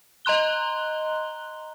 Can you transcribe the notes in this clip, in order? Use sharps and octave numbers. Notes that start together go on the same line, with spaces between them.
D#5 A#5 C6 F#6 G7